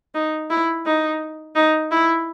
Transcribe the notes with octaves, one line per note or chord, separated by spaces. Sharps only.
D#4
E4
D#4
D#4
E4